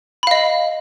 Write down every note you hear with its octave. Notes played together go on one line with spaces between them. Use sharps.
D#5 F5 B5